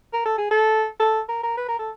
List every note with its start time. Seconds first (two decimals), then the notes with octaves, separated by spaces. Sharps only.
0.13 A#4
0.25 A4
0.38 G#4
0.51 A4
1.00 A4
1.29 A#4
1.43 A#4
1.57 B4
1.69 A#4
1.79 A4